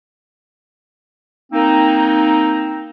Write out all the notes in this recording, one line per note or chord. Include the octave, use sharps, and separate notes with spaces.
A#3 C4 D#4